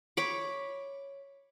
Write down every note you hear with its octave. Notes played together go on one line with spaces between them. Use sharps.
C#5 B5 D6